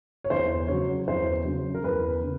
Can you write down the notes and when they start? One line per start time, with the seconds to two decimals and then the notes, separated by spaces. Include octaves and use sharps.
0.24 C#5
0.30 E2 C5
0.68 C#3 F#3 C#5
1.07 E2 C5
1.45 C#3 F#3
1.74 A#4
1.84 E2 B4
2.23 C#3